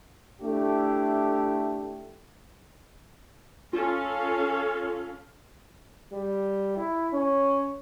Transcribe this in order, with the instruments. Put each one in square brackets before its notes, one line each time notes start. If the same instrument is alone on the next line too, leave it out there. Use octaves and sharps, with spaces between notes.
[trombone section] A3 D4 E4 G4
[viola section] C#4 A4 F5 [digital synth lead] F4
[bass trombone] G3
E4
C#4